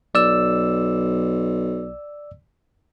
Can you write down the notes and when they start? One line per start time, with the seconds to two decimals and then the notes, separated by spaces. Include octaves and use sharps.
0.15 B1 D5 E6